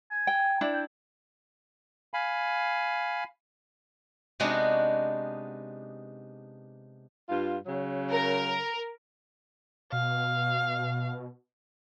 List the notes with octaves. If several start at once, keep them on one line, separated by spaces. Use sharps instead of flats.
G#5
G5
D4 E4
G5
F5 G#5 B5
C3 G#3 B3 D4 D#4 F#4
G2 F4
C#3 F#3
A#4
B2 F5